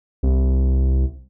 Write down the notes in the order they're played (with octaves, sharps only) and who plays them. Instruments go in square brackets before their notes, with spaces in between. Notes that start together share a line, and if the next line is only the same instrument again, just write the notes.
[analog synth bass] C2